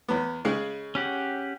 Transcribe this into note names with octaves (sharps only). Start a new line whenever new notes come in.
E2 B3
C#3 G#3
C#4 G4 F#5